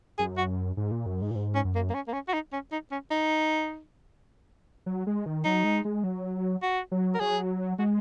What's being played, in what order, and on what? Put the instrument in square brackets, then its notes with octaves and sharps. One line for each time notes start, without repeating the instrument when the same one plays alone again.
[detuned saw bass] F#2 [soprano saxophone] G#4
[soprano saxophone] F#4
[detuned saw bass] G#2
A#2
F#2
G#2
A#2
G#2
[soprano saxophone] C#4
[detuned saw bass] F#2
[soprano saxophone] A#3
A#3
C#4
A#3
C#4
F#4
D#4
C#4
D#4
C#4
D#4
[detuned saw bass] F#3
G#3
D#3
[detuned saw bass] F#3 [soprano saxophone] D#4
[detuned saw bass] G#3
G#3
F#3
[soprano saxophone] F#4
[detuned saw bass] F#3
[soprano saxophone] A#4
[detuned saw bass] F#3 [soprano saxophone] G#4
[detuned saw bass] G#3 [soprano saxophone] F#4